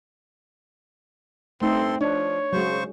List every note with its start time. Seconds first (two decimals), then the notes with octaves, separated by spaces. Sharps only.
1.62 G2 A3 C4 D#4 A4 C6
2.01 F3 D4 C#5
2.53 C#3 F#3 G#3 C5 C#6